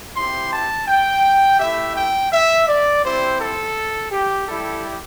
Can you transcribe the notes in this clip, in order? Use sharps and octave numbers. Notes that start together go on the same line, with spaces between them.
C4 E4 G4 C6
A5
G5
A3 E4 G4 E5
G5
E5
D5
C4 E4 G4 C5
A4
G4
G3 E4 G4 A4